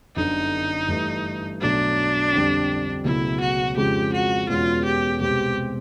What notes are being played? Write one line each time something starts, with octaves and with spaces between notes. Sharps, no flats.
G1 F#2 D3 D#4
G2 E3 A3
B1 B2 F#3 A3 D4
F2 D3 G3
C#2 B2 F#3 A3 C#4 E4
F#4
F2 C#3 F3 G#3 G4
F#4
E2 B2 G#3 C#4 F4 F#4
G4
C2 B2 G#3 C4 G4